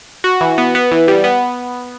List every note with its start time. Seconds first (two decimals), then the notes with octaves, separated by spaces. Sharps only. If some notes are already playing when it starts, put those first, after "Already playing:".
0.24 F#4
0.41 E3
0.58 B3
0.75 B3
0.92 E3
1.08 G3
1.24 B3